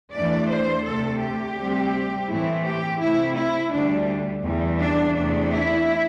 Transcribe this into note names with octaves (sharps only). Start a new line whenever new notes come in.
E2 E3 A3 D4 D5
C5
D2 C3 A3 A4
G4
D2 C3 G3 C4
A2 E3 A3 C4 E4
G4
C3 A3 C4 E4
E4
D2 D3 G3 D4
E2 E3 G3
D4
E2 C3 A3 D4
E4